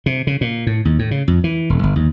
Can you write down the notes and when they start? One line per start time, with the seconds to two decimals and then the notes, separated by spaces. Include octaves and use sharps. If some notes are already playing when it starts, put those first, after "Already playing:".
0.06 C3
0.27 C#3
0.41 A#2
0.67 A2
0.85 D#2
0.99 A2
1.11 C#3
1.28 F2
1.44 E3
1.70 E1
1.83 G1
1.96 D#2